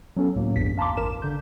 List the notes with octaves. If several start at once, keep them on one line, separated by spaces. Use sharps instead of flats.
F#3 B3 C#4 A4
C#2 A2 F#3 A#3
A1 E2 G2 B6
F5 A5 A#5 C6 D6
A1 A#4 E7
D3 G6